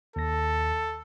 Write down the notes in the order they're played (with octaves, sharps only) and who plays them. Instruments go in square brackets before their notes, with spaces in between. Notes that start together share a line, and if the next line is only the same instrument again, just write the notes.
[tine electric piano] D#2 A#6 [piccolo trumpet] A4